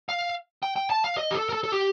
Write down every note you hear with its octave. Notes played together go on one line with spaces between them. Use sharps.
F5
G5
G5
A5
F5
D#5
G4
A4
A#4
A4
A4
G4